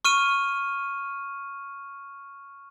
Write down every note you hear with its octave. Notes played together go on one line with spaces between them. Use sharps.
C#6 F6 D#7